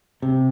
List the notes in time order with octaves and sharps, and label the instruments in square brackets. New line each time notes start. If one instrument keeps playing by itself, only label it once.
[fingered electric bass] C3